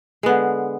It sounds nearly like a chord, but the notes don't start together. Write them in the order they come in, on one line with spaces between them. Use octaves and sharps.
G#3 B3 D3